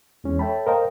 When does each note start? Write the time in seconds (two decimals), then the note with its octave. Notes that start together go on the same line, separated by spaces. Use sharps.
0.24 E2 E3 G#3 C#4
0.39 A4 C#5 E5 G5 A5 B5
0.67 A#4 C5 D#5 F5 G5 A#5